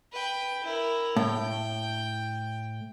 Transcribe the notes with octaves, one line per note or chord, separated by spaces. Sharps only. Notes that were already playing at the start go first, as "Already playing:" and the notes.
B4 G5
E4 A#4
A2 G5